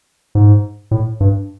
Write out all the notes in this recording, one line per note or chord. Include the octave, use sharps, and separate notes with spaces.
G#2
A2
G2